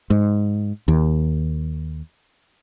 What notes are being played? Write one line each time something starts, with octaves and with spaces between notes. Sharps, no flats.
G#2
D#2